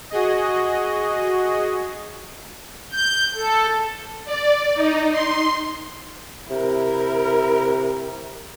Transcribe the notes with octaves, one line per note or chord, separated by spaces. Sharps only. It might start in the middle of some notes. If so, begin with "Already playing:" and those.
F#4 G#4 D#5
G6
A4
D5
D#4
C6
C3 E4 A#4